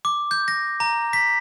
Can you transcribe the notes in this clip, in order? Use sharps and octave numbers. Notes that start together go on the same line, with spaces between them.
D6
G6
A#6
A#5
B6